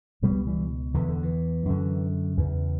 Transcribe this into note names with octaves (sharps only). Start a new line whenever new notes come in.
C#2 B2 G3 B3
E3 G3
E2 D3 E3
D3
E3
F#2 D3
E2 C#3 E3